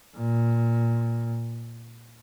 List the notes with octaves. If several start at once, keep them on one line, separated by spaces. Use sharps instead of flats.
A#2